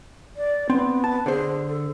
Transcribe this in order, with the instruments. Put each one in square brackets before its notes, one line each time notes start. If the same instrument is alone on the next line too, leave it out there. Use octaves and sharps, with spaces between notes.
[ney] D5
[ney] B3 [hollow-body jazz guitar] C4
[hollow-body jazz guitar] A5
[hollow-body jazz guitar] D3 C5 [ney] G#4
[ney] A4